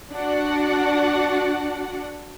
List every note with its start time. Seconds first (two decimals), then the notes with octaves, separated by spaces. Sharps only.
0.13 D4 F#4 D5 F#5